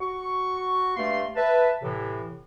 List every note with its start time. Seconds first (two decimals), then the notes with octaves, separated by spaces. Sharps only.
0.01 F#4 C#6
0.97 G2 A3 A#3 C6
1.36 B4 E5 A5
1.82 A2 C3 E3